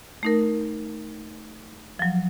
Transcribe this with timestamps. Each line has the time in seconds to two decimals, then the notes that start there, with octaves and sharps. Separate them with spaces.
0.23 A3 D#4 A#4
1.99 F3 F#3